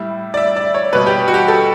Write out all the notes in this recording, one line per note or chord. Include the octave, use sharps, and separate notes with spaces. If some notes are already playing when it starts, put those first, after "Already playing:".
Already playing: A2 G3 E5
D5
E5
D5
C#5
B2 G3 B4
G4
F#4
G4
A4